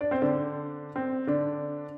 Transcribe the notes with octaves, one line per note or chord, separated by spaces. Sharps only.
D4 D5
C4 C5
D3 D4
C4
D3 D4